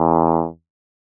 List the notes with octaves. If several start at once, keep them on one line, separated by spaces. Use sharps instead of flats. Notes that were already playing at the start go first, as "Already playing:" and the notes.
Already playing: E2